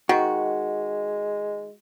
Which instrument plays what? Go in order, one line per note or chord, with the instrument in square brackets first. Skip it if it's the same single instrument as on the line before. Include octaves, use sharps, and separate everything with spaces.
[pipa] D#3 [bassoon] G#3 [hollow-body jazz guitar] F#4